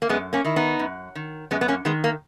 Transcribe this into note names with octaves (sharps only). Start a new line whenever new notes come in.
A#3
F#2 G#3 B3
A#3 C#4
D#3 E4
B3 D#4
F#2
D#3
F#2 G#3 B3
B3
A#3 C#4
D#3 G#3 B3
A#3